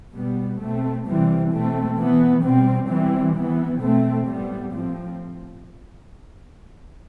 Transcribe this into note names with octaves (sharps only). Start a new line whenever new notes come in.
B2 G3 B3
B2 A3 C4
C3 E3 G3 C4
B2 A3 C4
E3 B3
B2 G3 C4
E3 G3 C4
E3 B3
B2 A3 C4
A2 G3 B3
A2 F3 C4